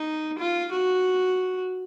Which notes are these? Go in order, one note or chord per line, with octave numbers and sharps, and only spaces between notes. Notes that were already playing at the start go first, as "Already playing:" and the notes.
Already playing: D#4
F4
F#4